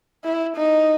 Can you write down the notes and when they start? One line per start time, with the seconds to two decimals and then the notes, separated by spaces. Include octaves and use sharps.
0.24 E4
0.56 D#4